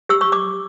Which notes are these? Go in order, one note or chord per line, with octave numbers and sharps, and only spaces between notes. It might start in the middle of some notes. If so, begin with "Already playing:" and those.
G4 E6
C#6
D6